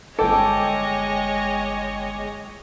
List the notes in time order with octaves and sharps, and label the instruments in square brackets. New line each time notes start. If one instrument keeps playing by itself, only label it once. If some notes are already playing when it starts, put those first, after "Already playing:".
[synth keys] G1 G5 D6 [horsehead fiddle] G#3 [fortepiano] A4 [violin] C#5 D#5